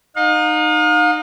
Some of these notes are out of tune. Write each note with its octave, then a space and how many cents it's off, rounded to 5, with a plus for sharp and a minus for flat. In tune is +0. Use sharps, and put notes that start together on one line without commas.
D#4 -15 F5 +40